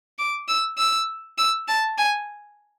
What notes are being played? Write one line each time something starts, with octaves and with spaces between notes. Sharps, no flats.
D6
E6
E6
E6
A5
G#5